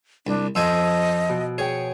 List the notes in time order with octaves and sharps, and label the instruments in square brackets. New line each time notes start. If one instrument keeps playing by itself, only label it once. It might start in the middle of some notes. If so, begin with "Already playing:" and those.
[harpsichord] C2 [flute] D4
[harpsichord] F2 C5 G#5 [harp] F3 E6 [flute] D#5
[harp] B2
[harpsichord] G#4 [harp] C#5 G5